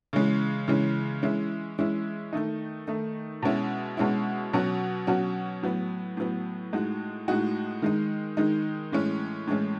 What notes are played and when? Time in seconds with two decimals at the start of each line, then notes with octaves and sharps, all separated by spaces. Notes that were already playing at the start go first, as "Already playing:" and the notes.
0.13 C#3 E3 G#3 C#4
0.68 C#3 E3 G#3 C#4
1.23 E3 G#3 C#4 E4
1.79 E3 G#3 C#4 E4
2.33 D#3 A3 D#4
2.88 D#3 A3 D#4
3.42 B2 G#3 C#4 E4
3.97 B2 G#3 C#4 E4
4.53 B2 F#3 C#4 F#4
5.07 B2 F#3 C#4 F#4
5.63 A2 F#3 B3
6.17 A2 F#3 B3
6.73 A2 G#3 D#4 F#4
7.28 A2 G#3 D#4 F#4
7.82 D#3 G#3 D#4
8.37 D#3 G#3 D#4
8.92 A2 E3 G#3 C#4
9.47 A2 E3 G#3 C#4